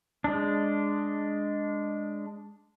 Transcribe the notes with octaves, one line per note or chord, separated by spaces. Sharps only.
G#3 D4